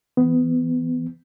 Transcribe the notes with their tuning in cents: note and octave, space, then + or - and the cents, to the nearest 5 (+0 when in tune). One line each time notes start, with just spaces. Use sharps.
E3 +0 B3 +20